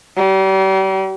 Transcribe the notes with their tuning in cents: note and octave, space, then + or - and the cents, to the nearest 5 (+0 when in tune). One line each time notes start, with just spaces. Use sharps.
G3 -40